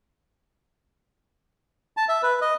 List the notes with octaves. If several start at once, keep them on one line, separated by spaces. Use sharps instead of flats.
A5
E5
B4
D#5